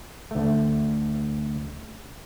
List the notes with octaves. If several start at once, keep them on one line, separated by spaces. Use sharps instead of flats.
D2 A3